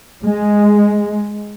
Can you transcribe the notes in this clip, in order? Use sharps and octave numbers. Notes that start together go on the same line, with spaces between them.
G#3